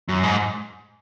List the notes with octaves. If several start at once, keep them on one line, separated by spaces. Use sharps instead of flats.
F#2
G#2